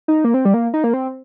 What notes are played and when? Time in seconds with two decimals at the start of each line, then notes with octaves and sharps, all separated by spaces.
0.08 D#4
0.24 A#3
0.34 C4
0.45 G3
0.54 A#3
0.74 D#4
0.84 A#3
0.94 C4